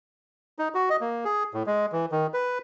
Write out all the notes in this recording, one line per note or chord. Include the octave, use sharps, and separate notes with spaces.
D#4
F#4
D#5
A#3
G#4
A2
G#3
E3
D#3
B4